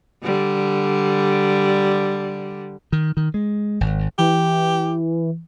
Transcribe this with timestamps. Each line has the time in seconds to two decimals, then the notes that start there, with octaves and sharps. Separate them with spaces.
0.23 D3 G3
2.92 D#3
3.17 D#3
3.34 G#3
3.81 G#1
4.19 E3 G4